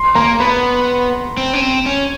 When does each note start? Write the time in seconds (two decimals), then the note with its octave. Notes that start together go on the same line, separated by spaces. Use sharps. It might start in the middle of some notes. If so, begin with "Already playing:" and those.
Already playing: C6
0.15 A#3 A#5
0.40 B3 B5
1.37 C4
1.53 C#4
1.61 C4
1.86 C#4